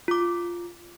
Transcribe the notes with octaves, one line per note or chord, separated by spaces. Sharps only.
F4 D6